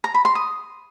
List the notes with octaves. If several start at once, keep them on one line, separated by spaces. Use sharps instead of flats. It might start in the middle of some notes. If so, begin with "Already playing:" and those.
A#5
B5
C6
D#6